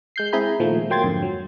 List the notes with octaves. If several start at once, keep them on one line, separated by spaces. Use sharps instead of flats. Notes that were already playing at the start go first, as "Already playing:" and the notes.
G#3 G6 C7
C4 E4 G#4 G#5 A#5 B5
A#2 D#3 F3 G#3 A3
F#3 A#3 G5 C6 G#6 A6
F2 G#2 D3
F#3